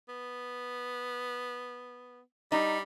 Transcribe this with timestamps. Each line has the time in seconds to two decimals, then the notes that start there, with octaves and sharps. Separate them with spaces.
0.09 B3
2.52 G3 D#4